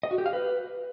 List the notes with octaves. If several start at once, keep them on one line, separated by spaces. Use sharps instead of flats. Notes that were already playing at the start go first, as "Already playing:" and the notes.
D#5
F#4
G4
F5
B4